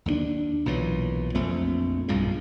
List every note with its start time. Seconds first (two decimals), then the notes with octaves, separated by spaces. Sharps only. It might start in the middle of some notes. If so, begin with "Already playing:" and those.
0.06 D#2 G#3 D4
0.66 B1 A#2 E3 F#3
1.35 A#1 F2 A3 C4
2.08 B1 G2 A#2 C#3